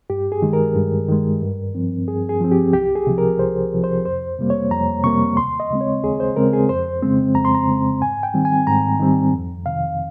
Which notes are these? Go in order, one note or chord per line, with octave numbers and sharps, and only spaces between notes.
G2 G4
G#4
D#3 G#3
A#4
G2
D#3 G#3
G2
F3 C4
G2 G#4
G#4
F3 C4
G4
C2 G4
G#4
C3 F3
A#4
C2 C5
C3 F3
C5
F2 C5
C3 G3 A#3
C#5
F2 A#5
C3 G3 A#3 C#6
D#2 C6
D#5
C#3 G#3 C4
C#5
D#2 G#4
C5
C#3 G#3 C4 A#4
G#4
F2 C5
C#3 G#3 C4
F2 A#5
C6
A#5
C#3 G#3 C4
G#2 G#5
G5
D#3 G3 C4
G#5
G#2 A#5
D#3 G3 C4
F2
C3 D#3 F5